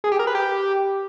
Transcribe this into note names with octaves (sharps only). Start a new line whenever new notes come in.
G#4
G4
A#4
B4
G4